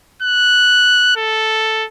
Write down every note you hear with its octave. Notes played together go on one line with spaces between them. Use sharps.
F#6
A4